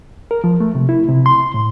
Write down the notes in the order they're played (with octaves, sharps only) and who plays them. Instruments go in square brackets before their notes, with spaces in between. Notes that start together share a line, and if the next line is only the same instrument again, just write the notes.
[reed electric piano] A#4
F3
A3
C3
E4
C3
C6
A2